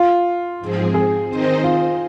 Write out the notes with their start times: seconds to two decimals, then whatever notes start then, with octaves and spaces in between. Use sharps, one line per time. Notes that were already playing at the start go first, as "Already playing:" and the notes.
Already playing: F4
0.59 G#2 F3 C4 G#4
0.94 G#4
1.29 D#3 C4 D#4 C5 D#5
1.64 F4